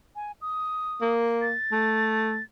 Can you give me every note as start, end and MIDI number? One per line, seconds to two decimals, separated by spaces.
0.16 0.32 80
0.41 1.13 87
1.01 1.53 58
1.42 2.43 93
1.72 2.39 57